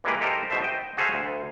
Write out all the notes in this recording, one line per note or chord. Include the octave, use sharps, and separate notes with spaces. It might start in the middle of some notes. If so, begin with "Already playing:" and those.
E3 G3 G#3 A#3 A#4 B4
D#4 G4 A4 A#4 C5
G#2 B2 C5 E5 A5
D#5 G5
F#4 G#4 A4 C5 E5 F5
D2